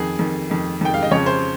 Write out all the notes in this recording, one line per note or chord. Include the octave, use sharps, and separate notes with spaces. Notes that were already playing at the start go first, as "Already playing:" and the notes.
Already playing: F2 D#3 G#4
F2 D#3
F2 D#3
F2 D#3 G5
F5
D#5
F2 C#3 F3 C#5
C5